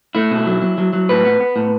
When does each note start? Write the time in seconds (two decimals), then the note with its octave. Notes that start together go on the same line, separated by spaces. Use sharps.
0.15 A3 E4
0.31 B2
0.47 F#3
0.62 F#3
0.78 F#3
0.93 F#3
1.09 A2 B4
1.25 B3
1.40 B3
1.56 A2